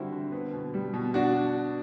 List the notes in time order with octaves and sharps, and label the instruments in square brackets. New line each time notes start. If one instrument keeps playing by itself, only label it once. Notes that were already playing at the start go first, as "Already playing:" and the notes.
Already playing: [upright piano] D3 G3 C4 E4 F#4
D3
B3
B2
G3
B2
D4 F#4